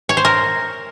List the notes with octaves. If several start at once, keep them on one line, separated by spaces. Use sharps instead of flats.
C#5
C5
A#4